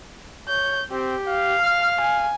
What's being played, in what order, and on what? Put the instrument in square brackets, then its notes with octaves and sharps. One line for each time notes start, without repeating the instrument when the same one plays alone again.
[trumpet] C#5 [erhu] G6
[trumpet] C4 [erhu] G4
[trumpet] F5
[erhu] F6
G#5